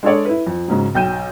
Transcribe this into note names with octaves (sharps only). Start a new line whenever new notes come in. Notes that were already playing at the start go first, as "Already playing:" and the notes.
G#3 D4 G#4 A4 C#5 D5
E4 B4
F2
G#2 C#3 F#3
B1 G5 G6 D#7 E7